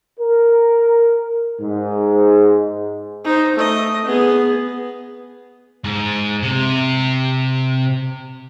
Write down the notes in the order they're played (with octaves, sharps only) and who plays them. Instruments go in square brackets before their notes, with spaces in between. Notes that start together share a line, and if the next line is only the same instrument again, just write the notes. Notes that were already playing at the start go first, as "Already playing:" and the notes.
[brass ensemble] A#4
G#2
[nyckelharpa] D#4 C5
A3 D#5
B3 G#4
[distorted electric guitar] G#2
C3